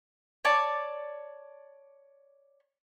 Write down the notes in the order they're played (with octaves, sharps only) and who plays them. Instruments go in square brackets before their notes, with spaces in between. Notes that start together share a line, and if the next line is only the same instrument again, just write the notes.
[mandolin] C#5 D5 A5